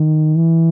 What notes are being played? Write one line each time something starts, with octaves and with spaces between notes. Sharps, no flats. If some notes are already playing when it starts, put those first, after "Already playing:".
Already playing: D#3
E3